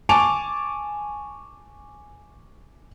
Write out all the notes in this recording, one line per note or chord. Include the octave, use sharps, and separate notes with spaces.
G#5 A5 C#6 D6 D7 F7